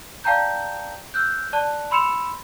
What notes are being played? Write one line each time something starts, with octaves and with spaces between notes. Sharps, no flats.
D5 F5 G5 A5 A#5 G6
E6 F#6 G6
D5 A5 F#6
B5 C6 E6 C#7 E7 F7